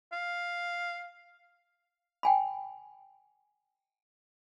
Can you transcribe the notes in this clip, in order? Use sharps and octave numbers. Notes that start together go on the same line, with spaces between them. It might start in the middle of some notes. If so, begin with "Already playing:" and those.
F5
G5 G#5 B5